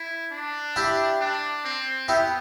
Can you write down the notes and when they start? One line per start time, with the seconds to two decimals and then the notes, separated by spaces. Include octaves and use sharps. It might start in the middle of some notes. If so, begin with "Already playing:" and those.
Already playing: E4
0.31 D4
0.76 E4 G4
1.21 D4
1.65 C4
2.08 B3 E4 G4